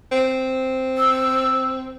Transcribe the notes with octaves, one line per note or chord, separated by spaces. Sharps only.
C4
E6